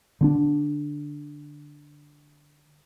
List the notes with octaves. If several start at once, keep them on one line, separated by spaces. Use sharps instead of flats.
D3 C4 D4